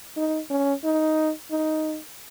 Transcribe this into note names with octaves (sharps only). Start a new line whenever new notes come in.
D#4
C#4
D#4
D#4